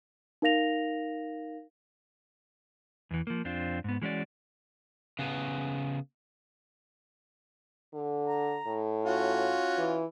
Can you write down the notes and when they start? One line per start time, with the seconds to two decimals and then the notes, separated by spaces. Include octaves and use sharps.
0.42 D#4 A#4 F5 A#6 F7
3.11 E2 E3
3.27 F3 A#3
3.45 F2 C4 D4 F4
3.84 G#2 B3
4.02 E3 G#3 C#4 F#4 D5
5.19 C#3 B3
7.93 D3
8.27 A#5
8.66 A2
9.05 C#4 F4 F#4
9.78 E3